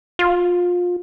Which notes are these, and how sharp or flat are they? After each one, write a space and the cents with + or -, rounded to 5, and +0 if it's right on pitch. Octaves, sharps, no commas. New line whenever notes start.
F4 +25